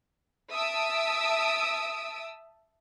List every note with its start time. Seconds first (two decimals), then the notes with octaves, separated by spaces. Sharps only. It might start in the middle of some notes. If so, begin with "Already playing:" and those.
0.52 E5 A5 D#6 E6 D7